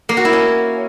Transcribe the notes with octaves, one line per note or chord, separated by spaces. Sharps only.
A#3
F#4
E4
C#4